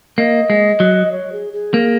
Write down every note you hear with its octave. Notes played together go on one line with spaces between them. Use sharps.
A#3 D#5
G#3
F#3
C#5
G#4
G#4
A#3